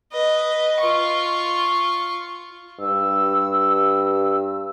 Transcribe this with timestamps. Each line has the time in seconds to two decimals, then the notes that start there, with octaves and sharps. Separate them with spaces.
0.13 B4 D#5
0.80 F4 C#6
2.80 G2 E6